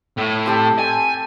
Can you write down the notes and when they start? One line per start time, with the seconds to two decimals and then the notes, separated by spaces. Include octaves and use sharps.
0.18 A2
0.46 C4 G4 A4
0.78 G#5